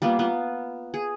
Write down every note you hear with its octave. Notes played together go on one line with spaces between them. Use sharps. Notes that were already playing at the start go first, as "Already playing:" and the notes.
G3 A#3 B3 F4
B3 F4
G#4